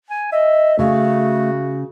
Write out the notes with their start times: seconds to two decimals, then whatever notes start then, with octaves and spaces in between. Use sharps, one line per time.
0.10 G#5
0.32 D#5 E5
0.79 C#3 A3 F#4